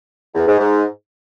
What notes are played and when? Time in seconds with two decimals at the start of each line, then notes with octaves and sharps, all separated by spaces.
0.34 E2
0.46 G#2
0.58 G#2